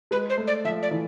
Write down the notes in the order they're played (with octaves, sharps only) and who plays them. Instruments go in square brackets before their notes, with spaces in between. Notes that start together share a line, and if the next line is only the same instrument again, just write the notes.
[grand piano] G#3 [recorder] B4
[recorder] C5
[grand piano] A3
[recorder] D5
[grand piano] F3 [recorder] E5
[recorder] D5
[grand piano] E3